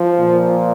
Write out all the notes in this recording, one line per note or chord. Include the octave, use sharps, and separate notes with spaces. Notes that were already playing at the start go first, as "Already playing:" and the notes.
Already playing: F3
A#2